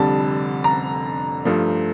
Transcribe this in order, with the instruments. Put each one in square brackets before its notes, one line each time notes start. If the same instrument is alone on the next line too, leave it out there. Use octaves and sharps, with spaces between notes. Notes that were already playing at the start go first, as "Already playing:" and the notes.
Already playing: [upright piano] F1 F2 D3 G3 A5
A#5
G2 F3 A3